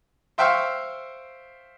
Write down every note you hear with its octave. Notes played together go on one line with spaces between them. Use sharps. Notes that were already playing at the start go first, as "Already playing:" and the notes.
C5 E5 F5 G5 C6 C#6